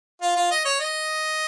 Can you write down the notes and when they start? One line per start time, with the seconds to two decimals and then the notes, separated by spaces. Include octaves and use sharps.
0.22 F4
0.36 F4
0.51 D#5
0.65 C#5
0.80 D#5